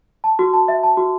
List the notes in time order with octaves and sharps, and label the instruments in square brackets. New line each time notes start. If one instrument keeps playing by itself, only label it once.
[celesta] A5
F#4
A5
E5
A5
F#4